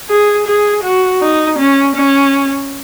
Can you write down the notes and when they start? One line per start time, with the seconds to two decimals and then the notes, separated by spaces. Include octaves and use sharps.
0.09 G#4
0.47 G#4
0.83 F#4
1.21 D#4
1.58 C#4
1.95 C#4